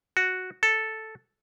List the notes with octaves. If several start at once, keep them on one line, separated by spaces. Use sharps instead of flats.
F#4
A4